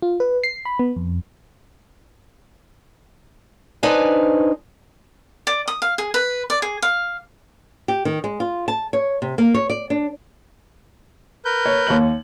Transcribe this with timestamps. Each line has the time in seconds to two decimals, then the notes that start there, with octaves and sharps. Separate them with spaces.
0.02 F4
0.20 B4
0.44 C7
0.65 B5
0.79 B3
0.96 F2
3.83 D4 D#4 B4 C5 G#5
5.47 D5
5.68 D#6
5.82 F5
5.98 G#4
6.14 B4
6.50 D5
6.62 G#4
6.82 F5
7.88 G4
8.05 D#3
8.24 G#3
8.40 F4
8.68 A5
8.93 C#5
9.22 C3
9.38 A#3
9.54 C#5
9.70 D5
9.90 D4
11.45 A#4 B4 G6
11.66 C#5
11.87 D#2 C#5 F#7